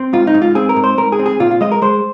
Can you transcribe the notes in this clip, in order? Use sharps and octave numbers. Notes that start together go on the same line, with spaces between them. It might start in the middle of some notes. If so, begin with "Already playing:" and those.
Already playing: C4
G#2 F4
D#4
G#2
F4
C4 G#4
A#4
G#2
C5
G#2 A#4
G#4
C4
G#4
A#2 F4
F4
G#3 D#5
A#4
G#3 C5